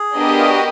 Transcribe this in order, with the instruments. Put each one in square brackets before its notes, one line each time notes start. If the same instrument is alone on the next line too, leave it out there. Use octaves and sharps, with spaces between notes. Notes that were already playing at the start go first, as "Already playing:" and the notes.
Already playing: [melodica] G#4
[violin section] B3 D4 G4 A#4 D#5
[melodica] F4
F#4